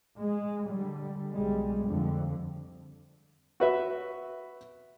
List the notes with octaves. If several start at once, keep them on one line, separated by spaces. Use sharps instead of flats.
G#3
D3 G3
B1 G3 G#3
F2 D3
F#4 B4 E5